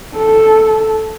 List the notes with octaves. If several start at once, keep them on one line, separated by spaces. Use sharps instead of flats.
A4